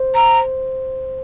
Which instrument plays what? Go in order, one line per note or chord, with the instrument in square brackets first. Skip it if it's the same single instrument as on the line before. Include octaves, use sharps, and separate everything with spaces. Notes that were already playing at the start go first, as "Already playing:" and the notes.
Already playing: [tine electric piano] C5
[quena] A#5